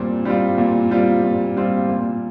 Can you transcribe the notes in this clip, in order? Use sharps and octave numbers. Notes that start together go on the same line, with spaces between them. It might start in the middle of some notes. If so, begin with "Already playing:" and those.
Already playing: A#2 G3 C4
G3 C4 F4
A#2
G3 C4 F4
A#2
G3 C4 F4
A#2